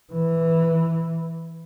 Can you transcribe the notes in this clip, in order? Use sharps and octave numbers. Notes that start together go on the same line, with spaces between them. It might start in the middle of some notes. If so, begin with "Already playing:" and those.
E3